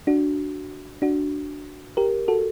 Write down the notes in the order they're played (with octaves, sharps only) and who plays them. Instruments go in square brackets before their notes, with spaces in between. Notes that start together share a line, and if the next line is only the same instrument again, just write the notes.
[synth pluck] D4 F#4
D4 F#4
G4 A#4
F#4 A4